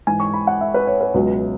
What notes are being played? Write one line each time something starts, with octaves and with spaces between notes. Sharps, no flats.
G#2 E3 G#5
C#6
B5
F#5
E5
B4
C#5
B4
C#2 B2 F#3